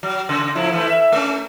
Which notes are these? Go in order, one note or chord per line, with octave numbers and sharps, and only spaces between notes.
F#3
C#3
A2 F3 E4
E3 A3 E4
E5
A3 C#4